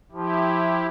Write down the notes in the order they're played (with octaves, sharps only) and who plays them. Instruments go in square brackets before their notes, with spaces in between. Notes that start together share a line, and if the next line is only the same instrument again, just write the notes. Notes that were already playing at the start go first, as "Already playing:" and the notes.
[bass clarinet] F3 [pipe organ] E4 G4